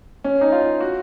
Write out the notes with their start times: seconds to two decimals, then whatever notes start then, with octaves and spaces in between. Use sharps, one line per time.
0.24 C#4
0.41 D#4
0.52 F4
0.81 F#4